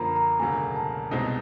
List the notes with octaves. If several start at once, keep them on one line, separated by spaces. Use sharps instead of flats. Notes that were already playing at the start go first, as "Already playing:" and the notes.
Already playing: F#2 D3 F3 A#3 A#5 B5
A#5
E1 D2 C#3 F#3 A#3 G#5
A5
C2 B2 G#3 C4 D#4